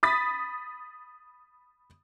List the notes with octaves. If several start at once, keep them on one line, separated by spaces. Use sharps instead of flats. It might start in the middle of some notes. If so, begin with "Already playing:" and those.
B5 D#6 A6 B6